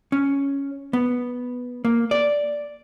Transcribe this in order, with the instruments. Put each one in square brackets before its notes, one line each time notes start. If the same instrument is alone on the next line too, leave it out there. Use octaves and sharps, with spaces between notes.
[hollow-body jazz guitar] C#4
B3
A#3
D5